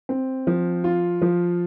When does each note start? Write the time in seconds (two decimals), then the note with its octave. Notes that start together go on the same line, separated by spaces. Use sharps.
0.09 C4
0.47 F3
0.84 F4
1.22 F3